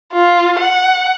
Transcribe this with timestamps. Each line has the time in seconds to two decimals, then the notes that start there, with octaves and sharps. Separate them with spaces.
0.13 F4
0.59 F#5